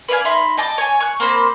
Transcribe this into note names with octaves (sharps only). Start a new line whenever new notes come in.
B4 D5 F5 G#5
D#4 E5 B5 C6
D#5 G5 A5 D6
C#5 G#5
C#6 F#6
A#3 C4 C5 B5